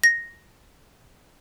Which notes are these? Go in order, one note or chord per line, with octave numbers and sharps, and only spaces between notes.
A#6